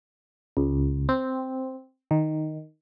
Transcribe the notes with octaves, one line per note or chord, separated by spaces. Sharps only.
C#2
C4
D#3